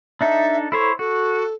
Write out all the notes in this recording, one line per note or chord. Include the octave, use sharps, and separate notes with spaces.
D4 D#4 A4 E5
E4 A4 C5 C#5
F#4 A4